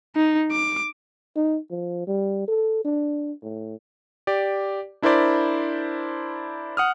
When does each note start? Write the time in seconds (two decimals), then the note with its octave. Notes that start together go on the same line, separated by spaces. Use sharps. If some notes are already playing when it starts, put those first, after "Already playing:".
0.16 D#4
0.51 D6
1.36 D#4
1.71 F3
2.07 G3
2.48 A4
2.85 D4
3.43 A2
4.27 G4 D5
5.02 D4 E4 A#4 C5 D5 B5
6.77 F#5 D#6 F6